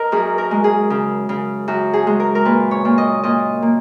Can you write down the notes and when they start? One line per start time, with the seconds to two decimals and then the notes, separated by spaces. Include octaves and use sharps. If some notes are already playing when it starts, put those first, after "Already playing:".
Already playing: A#4 D#5
0.12 F#2 G#4
0.38 A#4
0.51 G#3
0.64 G#4
0.90 C#3
1.29 C#3
1.68 F#2 F#4
1.93 G#4
2.07 G#3
2.20 A#4
2.35 A#4
2.45 A#2 B4
2.71 C#5
2.85 A#2
2.98 D#5
3.23 A#2 D#5
3.62 A#3